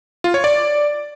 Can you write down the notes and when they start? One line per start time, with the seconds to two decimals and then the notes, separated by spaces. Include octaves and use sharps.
0.24 F4
0.34 C#5
0.44 D5